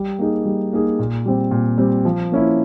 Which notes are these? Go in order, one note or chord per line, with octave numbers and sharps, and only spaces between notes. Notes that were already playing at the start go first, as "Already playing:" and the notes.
Already playing: G3
A#3 D#4 G#4
G3
A#3 D#4 G#4
A#2
G3 C4
A#2
G3 C4
F3
A#3 C#4 E4